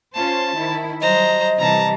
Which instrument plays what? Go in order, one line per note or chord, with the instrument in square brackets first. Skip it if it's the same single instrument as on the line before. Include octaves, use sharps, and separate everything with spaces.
[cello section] C#4 F4 C5 [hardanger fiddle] A5
[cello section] D#3 E4
[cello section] F#3 G3 [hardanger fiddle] C5 A#5 [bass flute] D#5
[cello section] C3 E3 G3 [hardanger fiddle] A5 A#5